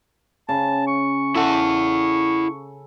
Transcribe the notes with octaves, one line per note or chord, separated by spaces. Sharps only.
C#3 A5
C#6
E4 A4 F#5